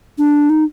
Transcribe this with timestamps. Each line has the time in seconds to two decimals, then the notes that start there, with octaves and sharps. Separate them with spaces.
0.18 D4
0.50 D#4